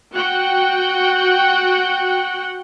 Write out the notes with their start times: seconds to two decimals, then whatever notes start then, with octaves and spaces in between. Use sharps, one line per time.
0.14 F#4 F#5 G5